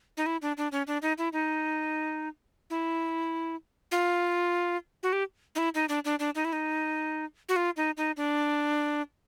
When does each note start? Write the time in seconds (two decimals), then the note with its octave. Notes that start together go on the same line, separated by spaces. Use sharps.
0.17 D#4
0.26 E4
0.42 D4
0.57 D4
0.72 C#4
0.87 D4
1.02 D#4
1.18 E4
1.33 D#4
2.70 E4
3.91 F4
5.03 F#4
5.13 G4
5.55 D#4
5.58 E4
5.75 D#4
5.89 D4
6.05 D4
6.19 D4
6.35 D#4
6.45 E4
6.53 D#4
7.49 F#4
7.56 F4
7.76 D#4
7.97 D#4
8.17 D4